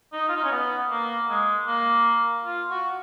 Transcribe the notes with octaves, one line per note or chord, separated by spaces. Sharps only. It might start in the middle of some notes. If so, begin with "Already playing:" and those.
D#4
F4
D#4
C#4
B3
A#3
G#3
A#3
F4
F#4